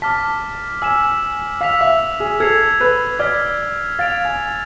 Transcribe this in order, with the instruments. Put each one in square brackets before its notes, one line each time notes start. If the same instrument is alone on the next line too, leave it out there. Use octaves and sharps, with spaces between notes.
[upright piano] A5 [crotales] D6 F6 B6
[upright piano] G#5 [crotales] E6 B6 E7
[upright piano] F5 [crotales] E6 B6 F7
[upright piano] E5
G#4
[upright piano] A4 [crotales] G#6 C7 F7
[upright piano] B4
[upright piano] D5 [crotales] F6 G#6 B6
[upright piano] F5 [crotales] A6 D7 F7
[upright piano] G#5